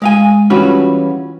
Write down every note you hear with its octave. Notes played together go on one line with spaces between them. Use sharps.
G#3 F5 G#5
E3 G3 C#4 F4 F#4 B4